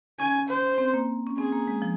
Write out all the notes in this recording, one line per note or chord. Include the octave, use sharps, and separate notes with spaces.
C#4 G#5
C5
C4
A#3
C#4
C4 G#4
A#3
G#3
F3